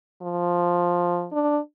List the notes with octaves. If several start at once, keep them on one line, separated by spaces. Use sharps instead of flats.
F3
D4